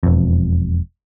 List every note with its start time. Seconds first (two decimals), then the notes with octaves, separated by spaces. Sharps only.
0.03 E1 F2